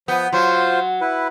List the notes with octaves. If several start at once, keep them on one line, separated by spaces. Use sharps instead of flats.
F3 B3 G6
F#3 F4 C5
E4 B4